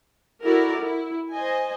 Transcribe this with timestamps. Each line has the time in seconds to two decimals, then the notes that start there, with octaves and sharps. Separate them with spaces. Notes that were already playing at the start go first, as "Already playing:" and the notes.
0.43 E4 F#4 A4 A#4 D5
0.82 E4
1.31 C5 D#5 G#5